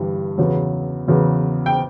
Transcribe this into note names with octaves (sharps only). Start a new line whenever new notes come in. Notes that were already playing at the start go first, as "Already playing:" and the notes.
Already playing: G1 G2 E3 G3
E2 C#3 F#3
E2 C#3 F#3
G5